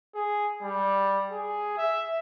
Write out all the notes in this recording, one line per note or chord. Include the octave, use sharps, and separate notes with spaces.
G#4
G3
G#4
E5